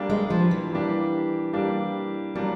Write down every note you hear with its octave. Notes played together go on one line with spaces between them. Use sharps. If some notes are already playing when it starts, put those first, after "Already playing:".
Already playing: G3 A#3 D4 G4
G#3
F3
E3
G3 A#3 D4 G4
G3 A#3 D4 G4
F#3 G3 A#3 D4 G4